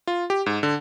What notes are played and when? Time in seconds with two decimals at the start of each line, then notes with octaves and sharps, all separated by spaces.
0.07 F4
0.30 G4
0.46 G#2
0.63 D3